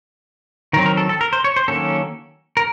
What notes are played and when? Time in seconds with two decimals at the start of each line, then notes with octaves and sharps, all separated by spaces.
0.73 D#3 F#3 C4 A#4
0.86 A#4
0.97 A4
1.09 A4
1.21 A#4
1.33 C5
1.44 C#5
1.56 C5
1.68 D#3 F#3 A#3 C#4 A4
2.57 A#4